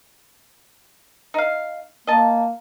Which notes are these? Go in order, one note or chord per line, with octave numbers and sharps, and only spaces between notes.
D#4 F5
A#3 D#5 A5